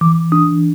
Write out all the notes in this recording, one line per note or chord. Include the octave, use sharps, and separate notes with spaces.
E3 D6
D4 D#6